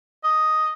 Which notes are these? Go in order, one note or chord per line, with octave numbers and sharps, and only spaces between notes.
D#5